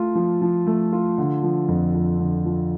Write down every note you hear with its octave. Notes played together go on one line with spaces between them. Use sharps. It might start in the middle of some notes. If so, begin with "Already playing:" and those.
Already playing: A3 F4
F3
F3
A3
F4
D3
F3
F2
F2
D3
F3